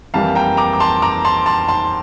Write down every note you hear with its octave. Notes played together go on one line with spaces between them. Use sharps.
F2 E3 G3 A#3 F5 A5
G5 A#5
A#5 D6
D6
A5 C6
A#5 D6
A5 C6
A5 C6
A5 C6